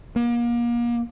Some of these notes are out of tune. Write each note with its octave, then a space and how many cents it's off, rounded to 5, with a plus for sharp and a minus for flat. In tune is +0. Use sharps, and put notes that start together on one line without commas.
A#3 +35